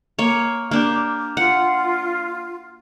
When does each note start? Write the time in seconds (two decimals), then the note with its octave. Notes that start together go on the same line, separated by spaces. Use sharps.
0.19 A#3 C#5
0.71 A#3 D4 G4
1.37 F4 F#5